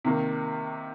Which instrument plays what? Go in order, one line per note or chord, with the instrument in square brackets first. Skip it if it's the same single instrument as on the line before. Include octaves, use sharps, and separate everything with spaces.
[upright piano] C3 D#3 A#3